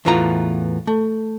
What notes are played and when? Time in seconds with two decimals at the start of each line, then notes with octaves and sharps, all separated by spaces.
0.05 E2 A2 E3 B3 F4 A#5
0.87 A3